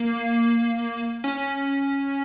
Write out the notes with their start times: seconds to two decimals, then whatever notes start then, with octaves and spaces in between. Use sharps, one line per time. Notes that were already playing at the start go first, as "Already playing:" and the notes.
Already playing: A#3
1.24 C#4